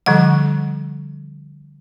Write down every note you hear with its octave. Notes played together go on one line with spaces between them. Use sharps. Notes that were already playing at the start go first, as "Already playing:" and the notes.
D3 F3 G3 F#5